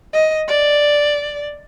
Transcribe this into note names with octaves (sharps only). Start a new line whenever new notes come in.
D#5
D5